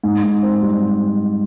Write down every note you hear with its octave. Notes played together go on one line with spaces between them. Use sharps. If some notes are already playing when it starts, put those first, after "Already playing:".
G#2
G#2
C4
G3